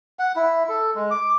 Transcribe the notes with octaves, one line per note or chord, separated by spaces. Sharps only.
F#5
E4
A4
G#3
D6